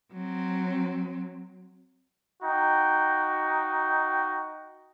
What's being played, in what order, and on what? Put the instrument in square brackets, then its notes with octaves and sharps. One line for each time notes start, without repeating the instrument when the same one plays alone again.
[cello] F#3 C4
[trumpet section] D#4 F#4 G5